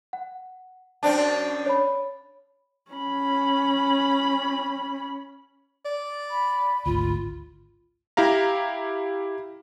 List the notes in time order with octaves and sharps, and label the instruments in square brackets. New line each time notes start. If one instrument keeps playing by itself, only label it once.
[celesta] F#5
[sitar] F#2 C4 D4 [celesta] D5 A5
[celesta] C#5 B5
[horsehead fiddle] C#4 B5
[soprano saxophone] D5
[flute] B5
[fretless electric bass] G#1 D2 [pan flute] F4
[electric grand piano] E4 G4 F5 A#5